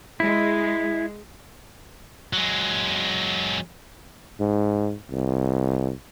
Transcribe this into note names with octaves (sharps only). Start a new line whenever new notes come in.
G#3 E4
F#3 G#3
G#2
C2